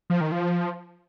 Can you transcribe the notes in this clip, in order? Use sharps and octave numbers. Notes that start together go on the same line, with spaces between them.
F3
D#3
F3